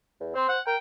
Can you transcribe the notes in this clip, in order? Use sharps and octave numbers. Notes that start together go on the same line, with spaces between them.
E2
C4 C5
F#5
A#4 G5